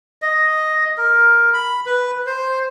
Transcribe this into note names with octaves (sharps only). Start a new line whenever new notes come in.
D#5
A#4
B5
B4
C5